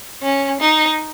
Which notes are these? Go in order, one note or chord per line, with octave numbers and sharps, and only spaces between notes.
C#4
D#4